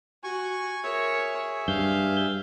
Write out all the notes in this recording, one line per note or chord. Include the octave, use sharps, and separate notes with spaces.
F#4 G#5 C#6
G#4 A#4 C#5 E5
G2 F5 G6